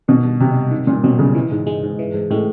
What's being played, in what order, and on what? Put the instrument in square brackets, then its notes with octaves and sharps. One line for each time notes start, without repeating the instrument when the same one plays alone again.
[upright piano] B2 [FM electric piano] D#3
[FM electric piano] G2
[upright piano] C3 [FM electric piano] F#3
[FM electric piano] G2
D#3
[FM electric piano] G2 [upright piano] A#2
[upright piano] B2 [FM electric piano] F#3
[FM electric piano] G2 [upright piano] C#3
[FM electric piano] E3
G#2
G#3
G#2
E3
G#2
[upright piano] A2 [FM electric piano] G#3